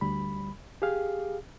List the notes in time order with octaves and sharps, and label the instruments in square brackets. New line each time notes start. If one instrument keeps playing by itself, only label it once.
[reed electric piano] D2 G3 B5
G4 G#4 F5